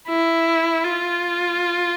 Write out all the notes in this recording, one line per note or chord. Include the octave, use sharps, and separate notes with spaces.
E4
F4